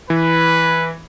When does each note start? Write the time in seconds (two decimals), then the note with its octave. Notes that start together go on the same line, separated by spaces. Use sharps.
0.10 E3 B4